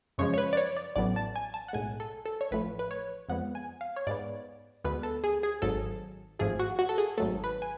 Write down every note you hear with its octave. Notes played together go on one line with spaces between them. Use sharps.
F#2 C#3 F3 G#3 C#5
C#5
B4
D5
C#5
D5
A1 A2 F#3 B3 D5
A5
G#5
A5
F#5
B1 A2 G#3 G#5
A4
A4
C#5
A1 A2 F3 A3 B4
B4
C#5
F2 F3 G#3 B3 F#5
G#5
F5
C#5
G#2 G#3 B3 D5
D2 D3 G#3 B3 B4
A4
G#4
G#4
G#1 G#2 F#3 A4
G#1 G#2 F3 A3 G#4
F#4
F#4
A4
G#4
G#1 G#2 F#3 A3 A4
B4
G#5